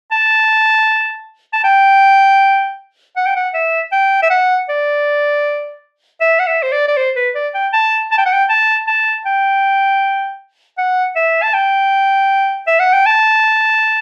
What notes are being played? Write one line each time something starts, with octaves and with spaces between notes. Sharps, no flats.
A5
A5
G5
F#5
G5
F#5
E5
G5
E5
F#5
D5
E5
F#5
E5
C5
D5
D5
C5
B4
D5
G5
A5
A5
G5
F#5
G5
A5
A5
G5
F#5
E5
A5
G5
E5
F#5
G5
A5